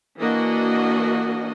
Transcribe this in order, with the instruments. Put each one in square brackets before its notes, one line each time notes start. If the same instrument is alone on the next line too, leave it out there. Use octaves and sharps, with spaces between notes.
[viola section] E3 A#3 D4 F#4 D#5